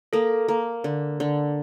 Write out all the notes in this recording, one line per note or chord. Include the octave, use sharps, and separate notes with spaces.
A#3 A4
A#3
D3
D3